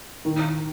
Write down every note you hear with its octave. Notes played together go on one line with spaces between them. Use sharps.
D#3